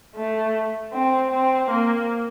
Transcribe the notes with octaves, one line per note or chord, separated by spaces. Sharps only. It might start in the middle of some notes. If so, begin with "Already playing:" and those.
A3
C4
C4
A#3